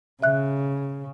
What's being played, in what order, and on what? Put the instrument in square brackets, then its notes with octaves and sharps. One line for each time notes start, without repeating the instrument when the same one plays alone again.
[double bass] C#3 [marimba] E5 F#6